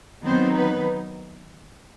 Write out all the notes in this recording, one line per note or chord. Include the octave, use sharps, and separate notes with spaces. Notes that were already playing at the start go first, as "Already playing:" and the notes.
D#3 F#3 B3 C4 D#4 C5
B3 B4